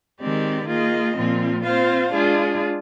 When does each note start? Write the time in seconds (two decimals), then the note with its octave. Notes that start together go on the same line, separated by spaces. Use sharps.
0.21 D#3 G#3 C4 G4 D5
0.68 A#3 F4 G#4 D#5
1.16 A#2 F3 C4 F4
1.63 C4 F4 C5 F5
2.12 G#3 D4 F4 G#4